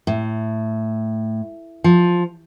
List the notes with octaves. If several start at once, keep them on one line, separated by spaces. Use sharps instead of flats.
A2
F3